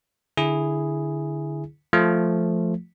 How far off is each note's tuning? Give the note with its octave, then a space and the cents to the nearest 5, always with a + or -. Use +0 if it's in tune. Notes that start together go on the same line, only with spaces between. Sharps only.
D3 +0 E4 +0 G#4 +0
F3 +0 A3 +0 F4 +0